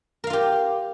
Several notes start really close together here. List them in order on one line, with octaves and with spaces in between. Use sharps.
A#4 F5 F4 G4